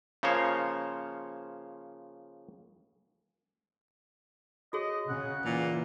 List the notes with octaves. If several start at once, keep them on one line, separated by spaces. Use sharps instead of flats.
C#3 F3 A#3 C5 C#5
F#4 G#4 C#5 D#5
C#3 F#5
A#2 E3